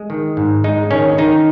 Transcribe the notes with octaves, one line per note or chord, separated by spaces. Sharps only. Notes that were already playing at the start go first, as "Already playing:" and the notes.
Already playing: G#3
D#3
G#2
G#3 D#4
D#3 C#4
D#3 D#4